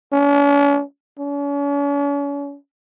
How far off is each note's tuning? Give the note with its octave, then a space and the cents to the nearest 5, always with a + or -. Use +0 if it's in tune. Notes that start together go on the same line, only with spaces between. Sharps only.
C#4 +45
C#4 +40